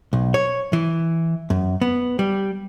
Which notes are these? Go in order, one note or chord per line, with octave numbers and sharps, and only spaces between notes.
B1
C#5
E3
F#2
B3
G3